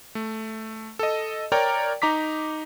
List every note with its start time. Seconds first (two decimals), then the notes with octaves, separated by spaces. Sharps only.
0.15 A3
0.99 A4 D#5
1.52 A#4 C#5 D5 G5 A#5
2.02 D#4 A#5 D6 B6